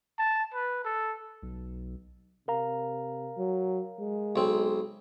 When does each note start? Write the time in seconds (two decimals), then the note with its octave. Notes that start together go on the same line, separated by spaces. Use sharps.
0.19 A5
0.54 B4
0.84 A4
1.43 B1
2.48 C3 A#4 F5 A#5
3.37 F#3
4.00 G#3
4.36 B1 C4